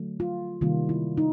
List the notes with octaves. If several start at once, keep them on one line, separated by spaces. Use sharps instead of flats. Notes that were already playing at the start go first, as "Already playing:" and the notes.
Already playing: D3 F#3 A3
F4
C3 D#3 G3 A#3 F4
E4
D#4